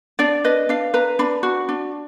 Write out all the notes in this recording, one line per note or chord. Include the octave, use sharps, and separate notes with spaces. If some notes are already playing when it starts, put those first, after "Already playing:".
D4 D5
B4 D#5
D4 F5
B4 A#5
D4 B5
F#4
D4